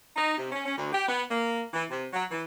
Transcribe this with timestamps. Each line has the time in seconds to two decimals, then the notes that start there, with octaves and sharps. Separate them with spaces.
0.16 D#4
0.37 C3
0.52 C#4
0.66 C#4
0.78 D2
0.93 G4
1.08 B3
1.30 A#3
1.73 E3
1.90 C3
2.13 F#3
2.31 E3